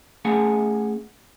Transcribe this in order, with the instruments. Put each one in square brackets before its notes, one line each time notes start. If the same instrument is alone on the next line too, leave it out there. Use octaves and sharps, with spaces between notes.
[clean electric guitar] A3 C#4 G#4 F#5 G#5